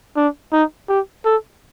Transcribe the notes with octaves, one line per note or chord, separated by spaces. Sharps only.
D4
D#4
G4
A4